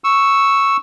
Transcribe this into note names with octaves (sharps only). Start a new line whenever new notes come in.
C#6 E6